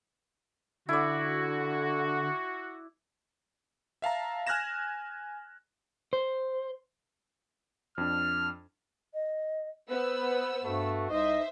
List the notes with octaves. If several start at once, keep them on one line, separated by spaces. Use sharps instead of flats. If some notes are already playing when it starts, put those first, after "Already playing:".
D3 E4 F#4 D5
E5 F5 A5 A#5
G#5 F6 F#6 G#6 A#6 E7
C5
F2 D4 F6
D#5
B3 B4 C5 E6
G2 A3 F#4
C2 D#4 C5 D#5 E5